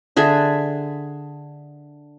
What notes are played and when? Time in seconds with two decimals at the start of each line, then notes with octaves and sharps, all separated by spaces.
0.17 D3 G#4 E5